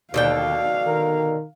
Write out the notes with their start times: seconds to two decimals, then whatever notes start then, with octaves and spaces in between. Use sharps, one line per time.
0.14 D#2 B2 D3 F5 G5
0.87 D#3 A#4